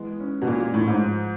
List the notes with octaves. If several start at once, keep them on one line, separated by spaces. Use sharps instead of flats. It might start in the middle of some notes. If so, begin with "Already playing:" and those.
Already playing: E3 G#3 B3
C#4
B2
A#2 E3
A#2
A2 G#3
G#2
F3